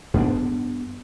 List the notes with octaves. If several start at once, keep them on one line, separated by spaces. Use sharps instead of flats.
G2 B3 D4